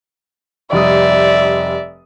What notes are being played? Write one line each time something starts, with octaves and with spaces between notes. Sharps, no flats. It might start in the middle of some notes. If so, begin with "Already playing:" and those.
F1 G3 D5 E5 D#6